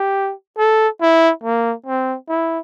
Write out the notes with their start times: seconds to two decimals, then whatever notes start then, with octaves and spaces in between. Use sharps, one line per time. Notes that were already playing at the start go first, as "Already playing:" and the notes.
Already playing: G4
0.58 A4
1.01 E4
1.44 A#3
1.86 C4
2.29 E4